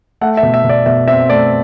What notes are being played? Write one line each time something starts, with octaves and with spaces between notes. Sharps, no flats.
A3 F#5
E5
B2
E5
B2
D5
B2 E5
C4 E5
A3 D5